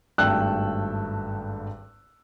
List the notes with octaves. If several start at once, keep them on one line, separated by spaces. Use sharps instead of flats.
G#1 G2 A3 G5 E6 F#6